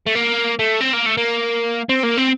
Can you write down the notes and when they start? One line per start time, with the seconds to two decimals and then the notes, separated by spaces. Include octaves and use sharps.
0.06 A3
0.15 A#3
0.59 A3
0.80 C4
0.93 A#3
1.06 A3
1.17 A#3
1.89 C4
2.03 A#3
2.18 C4